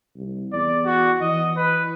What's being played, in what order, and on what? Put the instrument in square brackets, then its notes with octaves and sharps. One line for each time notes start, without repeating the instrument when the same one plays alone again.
[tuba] C2
[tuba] E2 [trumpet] D5
[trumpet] F#4
[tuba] E3 [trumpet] D#5
[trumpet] B4